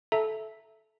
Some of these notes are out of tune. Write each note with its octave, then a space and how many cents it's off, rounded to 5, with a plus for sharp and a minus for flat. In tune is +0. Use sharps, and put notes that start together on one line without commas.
A4 -15 E5 +0 A#5 -15